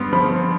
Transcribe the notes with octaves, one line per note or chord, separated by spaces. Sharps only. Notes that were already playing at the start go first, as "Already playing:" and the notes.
Already playing: G2 B3 C6
F3 B5